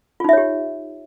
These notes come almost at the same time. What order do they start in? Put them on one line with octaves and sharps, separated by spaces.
F4 D#4 E5 C#5 G4